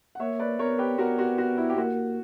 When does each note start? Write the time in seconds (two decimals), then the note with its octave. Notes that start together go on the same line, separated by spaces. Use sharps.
0.15 F#5
0.20 A#3 C#5 E5
0.39 B4 D5
0.59 B3 A#4 C#5
0.79 G4 B4
0.98 B3 F#4 A#4
1.19 F#4
1.38 F#4
1.57 E4
1.70 G4
1.78 A#3 F#4